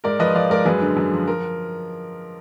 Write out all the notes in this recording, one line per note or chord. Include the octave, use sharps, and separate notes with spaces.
G#2 A#4 D5
F3 B4 D#5
F3 D5 F5
G#2 A#4 D5
F#2 G#4 B4
D3
F#2
F3
A#4